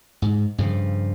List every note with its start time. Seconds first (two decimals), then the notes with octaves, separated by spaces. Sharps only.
0.22 G#2
0.58 G2 C#3 F3